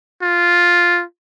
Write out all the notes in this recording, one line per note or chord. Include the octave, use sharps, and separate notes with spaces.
F4